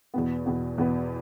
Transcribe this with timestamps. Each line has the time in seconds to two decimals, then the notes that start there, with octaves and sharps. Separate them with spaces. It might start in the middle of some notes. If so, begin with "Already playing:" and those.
0.14 E2 B2 B3
0.46 E2 B2 B3
0.78 E2 B2 B3